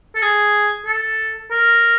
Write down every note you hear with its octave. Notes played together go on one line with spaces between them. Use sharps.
A4
G#4
A4
A#4